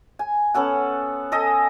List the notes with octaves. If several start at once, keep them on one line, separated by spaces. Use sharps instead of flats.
G#5
B3 C#4 A4 F#5
A4 D#5 G#5